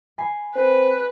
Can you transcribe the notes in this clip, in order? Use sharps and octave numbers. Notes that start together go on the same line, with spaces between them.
G#5 B5 C7
C4 B4